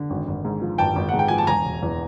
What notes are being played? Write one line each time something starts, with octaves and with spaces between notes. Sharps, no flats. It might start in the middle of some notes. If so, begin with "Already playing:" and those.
Already playing: D3
G#1
G#1
G#2
F3
G#1 G5 A5
G#1
F#5
G#2
G5
F3 G#5
A5
E1 G#5 A#5
E1
E2